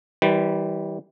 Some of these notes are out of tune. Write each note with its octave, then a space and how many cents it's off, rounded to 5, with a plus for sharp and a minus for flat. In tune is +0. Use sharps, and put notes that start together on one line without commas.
E3 -35 G3 -10 C5 -40